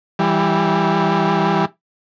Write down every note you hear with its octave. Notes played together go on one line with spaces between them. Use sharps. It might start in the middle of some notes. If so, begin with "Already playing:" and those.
E3 G3